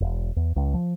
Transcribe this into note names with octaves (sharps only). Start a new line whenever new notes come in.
E1
E2
C#2
F3